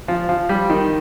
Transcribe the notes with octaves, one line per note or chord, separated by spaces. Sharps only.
F3
F3
G3
D#3